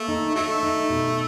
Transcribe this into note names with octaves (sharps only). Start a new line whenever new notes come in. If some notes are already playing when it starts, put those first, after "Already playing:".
Already playing: A3 A#3
D#4
F#3 A3 D#4
D#4
B2